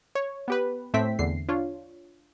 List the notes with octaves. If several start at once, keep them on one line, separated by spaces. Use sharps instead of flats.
C#5
B3 G4 B4
A2 A3 C4 E5 G5 B6
E2 D3 C7
D4 F4 C#5